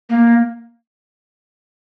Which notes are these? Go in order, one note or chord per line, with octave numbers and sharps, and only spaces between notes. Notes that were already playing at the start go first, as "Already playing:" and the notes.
A#3